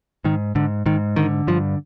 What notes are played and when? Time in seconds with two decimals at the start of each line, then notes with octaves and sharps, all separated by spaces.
0.25 G#2 D#3
0.55 G#2 D3
0.86 G#2 D#3
1.16 D3 D#3
1.47 G2 F3